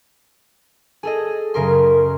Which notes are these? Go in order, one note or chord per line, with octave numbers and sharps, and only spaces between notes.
G#4 A4 D#5
F#2 C#3 A#4 C6